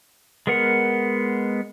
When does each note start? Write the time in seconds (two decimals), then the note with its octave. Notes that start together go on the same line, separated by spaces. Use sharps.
0.47 G#3 B3 A#4 F#5